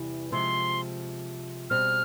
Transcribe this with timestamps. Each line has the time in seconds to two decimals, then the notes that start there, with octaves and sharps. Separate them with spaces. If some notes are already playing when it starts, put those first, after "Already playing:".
Already playing: E2 C3 E3 G3
0.32 C3 F3 G#3 C6
1.70 B2 G3 C4 F6